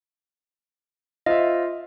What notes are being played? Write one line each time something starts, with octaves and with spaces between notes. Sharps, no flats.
F4 C5 D#5 E5